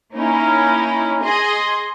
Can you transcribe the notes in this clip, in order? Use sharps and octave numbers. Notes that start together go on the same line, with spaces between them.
A#3 C#4 D#4 E4
G#4 D#5 C6